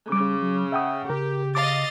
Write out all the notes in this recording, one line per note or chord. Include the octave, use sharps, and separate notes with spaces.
C#3 G3 D6
F#3
E5 F#5 G5 D#6
C#3 G4 A#4
D#5 F5 D6 A6